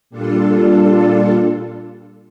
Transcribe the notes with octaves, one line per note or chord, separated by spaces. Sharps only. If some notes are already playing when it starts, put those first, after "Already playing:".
A#2 G3 D4 F4 A4